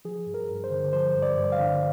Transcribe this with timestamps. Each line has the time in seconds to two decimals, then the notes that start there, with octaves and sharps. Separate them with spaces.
0.05 F3 G#4
0.26 G2
0.34 A#4
0.49 G2
0.64 C5
0.71 D3
0.93 F3 C5
1.15 G2
1.22 D5
1.37 G2
1.52 F5
1.59 D3